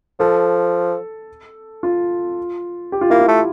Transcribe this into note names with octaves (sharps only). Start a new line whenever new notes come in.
F3 A4
F4
G4
F4
A#3 E4
F4
A3